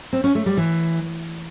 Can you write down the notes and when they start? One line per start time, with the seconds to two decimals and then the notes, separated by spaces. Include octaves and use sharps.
0.13 C4
0.24 C#4
0.35 A3
0.46 G3
0.57 E3